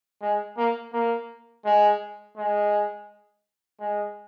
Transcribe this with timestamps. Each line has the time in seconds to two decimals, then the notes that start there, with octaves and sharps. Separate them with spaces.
0.22 G#3
0.58 A#3
0.93 A#3
1.65 G#3
2.37 G#3
3.80 G#3